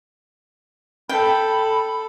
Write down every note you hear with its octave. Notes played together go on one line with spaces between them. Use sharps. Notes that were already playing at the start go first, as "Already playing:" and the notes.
A4 G5 B5